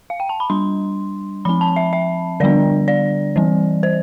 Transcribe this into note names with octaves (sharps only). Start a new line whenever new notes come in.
F5
G5
A5
B5
G3 D4 C6
F3 C4 B5
A5
E5
E5
D3 G3 B3 D4 D5
D5
E3 G3 C4
C5